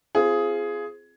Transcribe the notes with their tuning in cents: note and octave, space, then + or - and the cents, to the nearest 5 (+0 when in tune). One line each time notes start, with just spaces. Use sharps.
C4 +0 F4 -20 G#4 +10